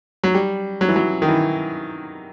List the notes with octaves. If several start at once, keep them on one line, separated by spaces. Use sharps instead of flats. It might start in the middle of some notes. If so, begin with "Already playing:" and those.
F#3
G3
F#3
E3
F#3
D#3
E3